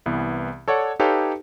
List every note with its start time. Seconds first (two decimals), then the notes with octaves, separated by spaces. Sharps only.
0.06 C2 E3 B3
0.68 A4 C#5 D5 F#5
0.99 D#4 G4 A4 B4 C#5 F5